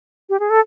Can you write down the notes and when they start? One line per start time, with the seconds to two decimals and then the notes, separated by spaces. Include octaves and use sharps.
0.30 G4
0.40 G#4
0.50 A4